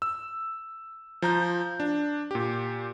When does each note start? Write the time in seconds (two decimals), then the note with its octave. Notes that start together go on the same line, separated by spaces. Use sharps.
0.02 E6
1.22 F3 A#5 G6
1.80 D4
2.31 A#2 G4